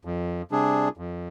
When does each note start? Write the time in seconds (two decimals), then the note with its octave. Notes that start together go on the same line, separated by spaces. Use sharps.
0.05 F2
0.51 C3 G3 D4 G#4
0.97 F2